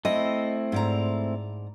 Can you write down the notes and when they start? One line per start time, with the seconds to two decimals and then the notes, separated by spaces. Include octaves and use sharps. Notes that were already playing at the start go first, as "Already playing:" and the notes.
0.05 A3 C4 E4 D#5
0.72 G#2 D5 A#5